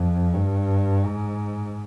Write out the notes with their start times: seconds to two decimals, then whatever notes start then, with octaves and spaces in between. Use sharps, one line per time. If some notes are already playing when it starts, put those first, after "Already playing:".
Already playing: F2
0.34 G2
1.06 G#2